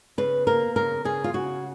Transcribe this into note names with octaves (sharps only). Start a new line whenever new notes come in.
C#3 B4
A#3 A#4
C#3 A#4
C#3 G#4
F4
C#3 F#4